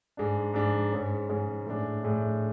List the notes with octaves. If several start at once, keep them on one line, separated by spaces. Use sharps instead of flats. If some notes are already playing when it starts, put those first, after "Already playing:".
G#2 G#3 D4
G#2 G#3 D4
G#2 G#3 C#4
G#2 G#3 C#4
A2 G#3 D4
A2 G#3 D4